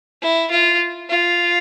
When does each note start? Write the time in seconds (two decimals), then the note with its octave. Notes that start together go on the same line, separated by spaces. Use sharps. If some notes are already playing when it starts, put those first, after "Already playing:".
0.22 E4
0.51 F4
1.09 F4